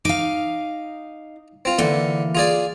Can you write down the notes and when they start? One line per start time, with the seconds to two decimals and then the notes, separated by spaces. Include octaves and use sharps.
0.05 D#4 F5 D6
1.65 C4 F4
1.78 D3 E3 A#3
2.35 F4 G#4 D5